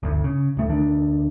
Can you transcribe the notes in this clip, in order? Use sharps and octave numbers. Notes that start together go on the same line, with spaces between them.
G1 D2
C#3
D1 A3
D2 D#3 D4